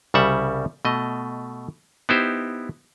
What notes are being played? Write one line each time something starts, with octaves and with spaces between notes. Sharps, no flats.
C2 C#3 G3 E5 F#5
B2 A3 D#5
B3 D#4 E4 G4 C5